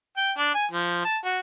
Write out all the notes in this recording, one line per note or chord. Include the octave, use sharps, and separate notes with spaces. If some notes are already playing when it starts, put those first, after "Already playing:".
G5
D4
G#5
F3
A5
F#4